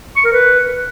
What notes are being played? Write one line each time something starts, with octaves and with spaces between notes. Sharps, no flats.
C#6
A#4
B4